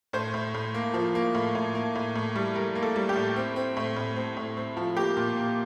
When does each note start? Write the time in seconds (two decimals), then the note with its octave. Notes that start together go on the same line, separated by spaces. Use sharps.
0.13 A2 C5
0.34 A2
0.54 A2
0.74 A#3
0.94 F3
1.15 A#3
1.35 A2
1.55 A2
1.75 A#3
1.95 A2
2.15 A2
2.36 G3
2.55 G3 A#4
2.75 A#3
2.83 A4
2.96 G3
3.09 G4
3.16 A2
3.36 C4
3.56 C4
3.77 A2
3.96 A2
4.16 C4
4.37 A2
4.57 C4
4.77 F3
4.97 A#3 G4
5.17 A#2
5.37 A#3